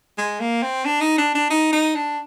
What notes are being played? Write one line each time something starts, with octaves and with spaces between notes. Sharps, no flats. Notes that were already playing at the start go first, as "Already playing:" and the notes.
G#3
A#3
C4
D4
D#4
D4
D4
D#4
D#4
D4